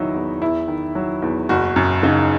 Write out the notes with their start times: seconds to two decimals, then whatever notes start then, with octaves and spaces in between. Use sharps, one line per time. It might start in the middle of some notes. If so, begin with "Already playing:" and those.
Already playing: E2 D#3 F#3 D#4 E4
0.14 E2
0.41 E2 E4
0.68 D#3
0.95 F#3
1.22 E2
1.49 F#1 F#4
1.76 F#2
2.03 C#3 D#4